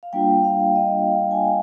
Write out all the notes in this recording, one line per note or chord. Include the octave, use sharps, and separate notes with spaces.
F5
G3 A#3 D4 F4 G5
F5
D#5
F5
G#5